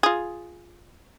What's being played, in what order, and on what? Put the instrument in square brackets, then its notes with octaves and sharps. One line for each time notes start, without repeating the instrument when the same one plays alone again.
[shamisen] F4 G#4